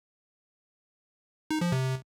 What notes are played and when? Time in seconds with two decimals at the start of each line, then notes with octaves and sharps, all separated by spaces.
1.51 D#4
1.61 F3
1.72 C3